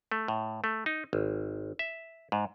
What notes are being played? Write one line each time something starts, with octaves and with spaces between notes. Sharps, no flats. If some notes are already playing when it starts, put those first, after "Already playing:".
A3
A2
A3
D#4
G#1
E5
G#2